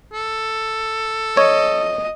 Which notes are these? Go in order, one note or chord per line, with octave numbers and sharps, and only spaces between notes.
A4
C#5 D#5